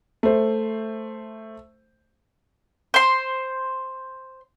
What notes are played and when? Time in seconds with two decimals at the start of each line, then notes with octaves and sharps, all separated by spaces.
0.23 A3 C5
2.94 C5 C6